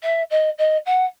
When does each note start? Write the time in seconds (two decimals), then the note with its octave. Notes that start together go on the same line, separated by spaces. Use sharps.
0.02 E5
0.30 D#5
0.58 D#5
0.85 F#5